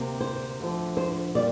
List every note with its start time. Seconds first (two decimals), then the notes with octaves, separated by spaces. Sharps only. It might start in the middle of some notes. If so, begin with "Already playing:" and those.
Already playing: D2 C3 A#3
0.20 C5
0.59 D2 D3 F3
0.97 C5
1.35 A#2 G3 A#3 D5